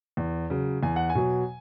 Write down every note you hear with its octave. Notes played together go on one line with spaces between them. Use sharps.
E2
C#3 F#3
E2 G#5
F#5
G#5
B2 F#3